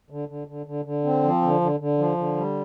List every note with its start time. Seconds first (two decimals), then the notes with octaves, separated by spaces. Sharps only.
0.10 D3
0.29 D3
0.47 D3
0.66 D3
0.85 D3
1.05 C4
1.23 F3
1.42 D3
1.61 D3
1.80 D3
1.98 F3
2.17 D3
2.36 G3